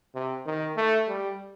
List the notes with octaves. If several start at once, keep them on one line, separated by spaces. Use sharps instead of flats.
C3
D#3
A3
G3